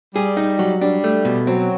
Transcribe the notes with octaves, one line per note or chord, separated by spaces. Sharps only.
G3 G#4
D#4
F#3
G3 D4
A3
B2
F#3 C4